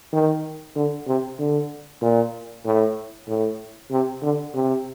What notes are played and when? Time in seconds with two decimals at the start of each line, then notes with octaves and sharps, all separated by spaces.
0.13 D#3
0.76 D3
1.07 C3
1.39 D3
2.02 A#2
2.65 A2
3.28 A2
3.91 C3
4.23 D3
4.55 C3